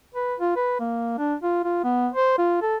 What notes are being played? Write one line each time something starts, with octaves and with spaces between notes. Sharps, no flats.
B4
F4
B4
A#3
D4
F4
F4
B3
C5
F4
A4